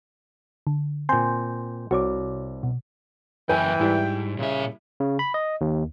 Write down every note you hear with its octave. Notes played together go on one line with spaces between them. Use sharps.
D3
A#2 C4 G#5 C6 G6
C2 F#4 C#5 D6
B2
F#2 E3 E4 B4 G5 G#5
G#2 G3 E4
A#2 C#3 E5
C#3
B5
D#5
D#2